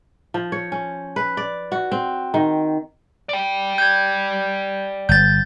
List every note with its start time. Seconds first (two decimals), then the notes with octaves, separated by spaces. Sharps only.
0.34 F3
0.52 C#5
0.72 C#4
1.16 B4
1.37 D5
1.72 F#4
1.92 C4
2.34 D#3
3.29 D5 G5
3.78 G6 G#6
5.09 G1 G6 A6